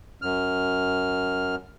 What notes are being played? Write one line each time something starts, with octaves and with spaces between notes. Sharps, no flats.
F#2 F6